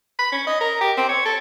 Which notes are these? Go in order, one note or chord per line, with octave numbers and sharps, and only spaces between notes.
B5
C#4
D#5
A#4
G4
C4
C#5
A4